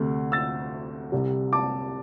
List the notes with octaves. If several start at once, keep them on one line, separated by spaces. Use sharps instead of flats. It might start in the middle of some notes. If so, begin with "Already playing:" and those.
Already playing: D2 C3 A3
E6 A6
C2 C3 G3
A5 D6